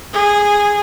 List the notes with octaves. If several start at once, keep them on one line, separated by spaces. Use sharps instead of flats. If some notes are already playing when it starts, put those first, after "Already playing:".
G#4